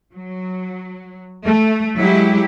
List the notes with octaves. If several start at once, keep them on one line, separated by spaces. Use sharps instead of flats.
F#3
A3
F#3 G#3 E4 G4